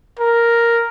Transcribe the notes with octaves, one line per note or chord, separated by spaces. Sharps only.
A#4